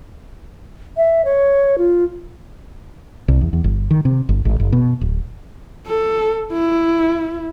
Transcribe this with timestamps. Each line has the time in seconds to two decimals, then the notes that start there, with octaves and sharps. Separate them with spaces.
0.97 E5
1.25 C#5
1.78 F4
3.28 C2
3.41 E2
3.53 E2
3.64 G1
3.91 D#3
4.05 C3
4.29 G1
4.45 G#1
4.60 F#1
4.73 B2
5.01 D1
5.87 A4
6.52 E4